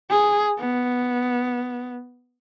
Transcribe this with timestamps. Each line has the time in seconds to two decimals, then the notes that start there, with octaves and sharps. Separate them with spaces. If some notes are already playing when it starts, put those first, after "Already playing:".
0.10 G#4
0.59 B3